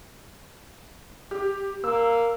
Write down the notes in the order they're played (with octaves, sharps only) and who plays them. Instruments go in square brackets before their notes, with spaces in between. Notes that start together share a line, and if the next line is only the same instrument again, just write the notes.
[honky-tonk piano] G4
[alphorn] A#3 [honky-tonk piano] E6